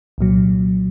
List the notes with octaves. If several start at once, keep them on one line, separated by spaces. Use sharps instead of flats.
C2 A#2 F#3